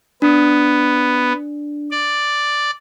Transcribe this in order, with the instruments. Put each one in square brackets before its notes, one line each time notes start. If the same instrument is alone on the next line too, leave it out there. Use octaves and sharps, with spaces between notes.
[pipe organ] B3 [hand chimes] D4
[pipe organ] D5